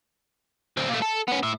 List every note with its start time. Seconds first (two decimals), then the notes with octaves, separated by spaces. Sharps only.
0.77 D2 C4
0.89 A#2 A3
1.02 A4
1.28 B3 C#4
1.43 A2 E5